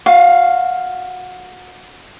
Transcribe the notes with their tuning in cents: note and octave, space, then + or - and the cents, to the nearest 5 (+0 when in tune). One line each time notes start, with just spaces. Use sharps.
F#4 -20 F5 +0